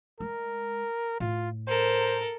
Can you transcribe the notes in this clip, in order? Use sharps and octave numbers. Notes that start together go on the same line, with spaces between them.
G#3 A#4
A2 F4
A4 A#4 C5